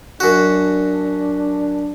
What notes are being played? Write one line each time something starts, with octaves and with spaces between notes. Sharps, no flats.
F#2 D4 F#4